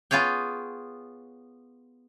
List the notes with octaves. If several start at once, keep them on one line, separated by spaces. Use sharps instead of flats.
B3 F4 G#4 C#5 G5